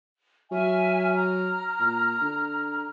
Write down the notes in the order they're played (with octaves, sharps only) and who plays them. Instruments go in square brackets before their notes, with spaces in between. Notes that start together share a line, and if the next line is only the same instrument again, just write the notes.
[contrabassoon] F#3 [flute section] E5 G#5 F6
[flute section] A#5 F6
[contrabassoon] A#2
D3